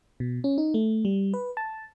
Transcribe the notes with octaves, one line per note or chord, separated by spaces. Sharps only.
B2
C#4
D#4
A3
G3
B4
A5